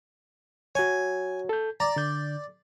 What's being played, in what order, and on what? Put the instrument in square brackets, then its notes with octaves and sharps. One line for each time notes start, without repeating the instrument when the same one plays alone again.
[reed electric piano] F#4 C#5 [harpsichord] G#5
[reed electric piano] A4 G6
[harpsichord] D5 [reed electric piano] A#5
[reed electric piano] D3 G6